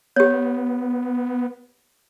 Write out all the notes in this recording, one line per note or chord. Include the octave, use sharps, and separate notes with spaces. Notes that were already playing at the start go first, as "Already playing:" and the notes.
B3 G4 C#5